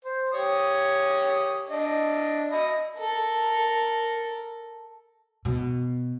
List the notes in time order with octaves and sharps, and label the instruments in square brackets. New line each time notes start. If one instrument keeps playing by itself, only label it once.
[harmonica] C5
G4 C#5 D#6
D4 D#5 E5
D#5 E5 B5
[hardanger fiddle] A4 A#4
[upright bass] B2